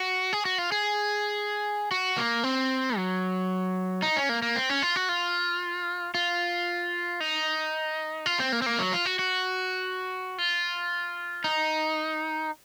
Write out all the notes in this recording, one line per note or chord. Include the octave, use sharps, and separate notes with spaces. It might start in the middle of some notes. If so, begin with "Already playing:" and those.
Already playing: F#4
G#4
F#4
F4
G#4
F#4
A#3
C4
F#3
D#4
C#4
A#3
A#3
C4
C#4
F4
F#4
F4
F4
D#4
F4
C4
A#3
C4
A#3
F#3
F4
F#4
F#4
F4
D#4